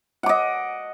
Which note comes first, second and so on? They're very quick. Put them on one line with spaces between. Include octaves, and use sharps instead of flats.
F#5 D6 D#5